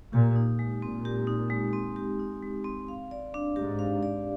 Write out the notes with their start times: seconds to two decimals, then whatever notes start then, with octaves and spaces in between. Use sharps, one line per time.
0.13 A#2 G4
0.36 D#4
0.59 G#3
0.82 A#2 C4
1.05 G4
1.27 D#4
1.50 G#3
1.73 C4
1.96 G4
2.19 D#4
2.43 G#3
2.64 C4
2.88 F5
3.11 D5
3.34 D4
3.56 G#2 G4
3.79 F5
4.03 D5